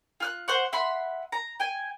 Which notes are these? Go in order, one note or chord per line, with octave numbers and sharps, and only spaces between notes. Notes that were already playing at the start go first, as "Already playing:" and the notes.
F4 F6 F#6
C5 F#5 C#6
E5 F#5 B5 C6
A#5
G5 G#5